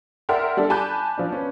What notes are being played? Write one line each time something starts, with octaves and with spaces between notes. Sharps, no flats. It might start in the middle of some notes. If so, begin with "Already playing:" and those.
A#4 D5 E5 F#5 G5 C6
G3 D4 A4
G#5 A5 B5 D6 F#6 G6
F3 D4
C#4 B4